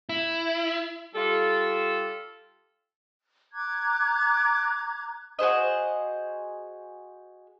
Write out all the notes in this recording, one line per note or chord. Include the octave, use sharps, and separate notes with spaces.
E4
G3 F4 A4
A#5 D6 F#6 G#6
F#4 G#4 C5 D#5